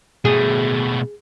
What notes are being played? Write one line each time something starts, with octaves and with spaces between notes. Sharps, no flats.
B2 A3 G#4